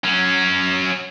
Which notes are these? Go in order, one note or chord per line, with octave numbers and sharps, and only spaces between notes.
F#3 C#4